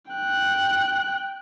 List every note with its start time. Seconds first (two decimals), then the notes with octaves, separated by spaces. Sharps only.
0.11 G5 F#6